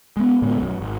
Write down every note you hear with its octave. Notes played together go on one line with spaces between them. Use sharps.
G#3 B3
A2 D3 G#3 B3
B1 F#2
G#1